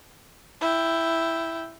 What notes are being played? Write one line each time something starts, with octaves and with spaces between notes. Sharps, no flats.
E4 G5